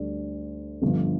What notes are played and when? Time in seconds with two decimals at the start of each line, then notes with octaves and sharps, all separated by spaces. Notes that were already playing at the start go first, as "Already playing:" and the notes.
Already playing: D2 G3 D4
0.82 G1 G2 D3 F3